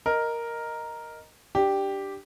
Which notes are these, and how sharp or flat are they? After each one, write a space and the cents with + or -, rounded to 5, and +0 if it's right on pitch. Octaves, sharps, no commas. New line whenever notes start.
A#4 +0 D#5 +0
D4 +10 G4 +0